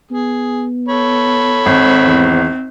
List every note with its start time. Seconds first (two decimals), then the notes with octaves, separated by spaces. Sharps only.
0.11 B3 G#4
0.89 A4 C#5 B5
1.66 G#1 C4
2.05 E2